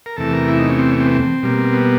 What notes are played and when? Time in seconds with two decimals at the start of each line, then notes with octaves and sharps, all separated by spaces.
0.06 A#4
0.17 E2 C3 E3 A3 A4
0.33 A#4
0.48 E4
0.59 D#4
0.69 C#4
0.79 C4
0.90 C#4
1.00 C4
1.06 B3
1.11 C4
1.43 B2 G3 A#3
1.74 B3